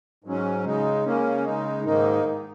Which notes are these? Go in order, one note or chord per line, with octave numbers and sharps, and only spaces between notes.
G#2 F#3 C#4
C#3 G#3 D#4
C#3 A#3 C#4
C#3 G#3 D#4
G#2 D#3 A#3 D#4